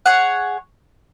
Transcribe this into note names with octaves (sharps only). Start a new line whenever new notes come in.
G#4 C#5 F#5